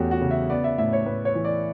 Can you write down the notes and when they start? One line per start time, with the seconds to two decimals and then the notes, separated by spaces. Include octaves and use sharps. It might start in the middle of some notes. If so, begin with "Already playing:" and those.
Already playing: E2 E3 A3 C#4 F#4 G4 A4
0.11 F#4
0.21 C#3
0.31 E5
0.50 B3 D5
0.64 E5
0.78 A2 E5
0.93 C#5
1.06 A2 B4
1.25 C#5
1.35 E3
1.45 D5